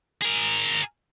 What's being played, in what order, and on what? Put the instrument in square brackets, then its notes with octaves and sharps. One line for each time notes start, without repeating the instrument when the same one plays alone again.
[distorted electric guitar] G#4 A#4